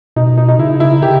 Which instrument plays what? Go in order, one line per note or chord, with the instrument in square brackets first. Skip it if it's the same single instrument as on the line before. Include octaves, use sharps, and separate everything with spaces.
[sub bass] B2 [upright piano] D#4
[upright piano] D#4
D#4
[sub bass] C#3 [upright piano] E4
[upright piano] E4
[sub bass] C#3 [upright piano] G4